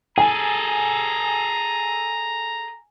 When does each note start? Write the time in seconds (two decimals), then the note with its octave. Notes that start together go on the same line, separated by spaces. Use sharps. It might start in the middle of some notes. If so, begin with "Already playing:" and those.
0.18 G#4 A4 G#5 A#5